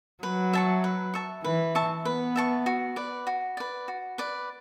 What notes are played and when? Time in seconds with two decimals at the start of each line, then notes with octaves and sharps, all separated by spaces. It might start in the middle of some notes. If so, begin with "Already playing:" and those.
0.23 F#3 B4
0.53 E5 A5 C#6
0.84 B4
1.14 E5 A5 C#6
1.44 E3 B4
1.75 E5 A5 C#6
2.05 B3 B4
2.36 E5 A5 C#6
2.66 F#4
2.96 B4 D5
3.27 F#4
3.57 B4 D5
3.88 F#4
4.18 B4 D5